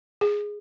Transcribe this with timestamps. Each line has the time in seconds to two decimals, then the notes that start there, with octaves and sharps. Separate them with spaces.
0.21 G#4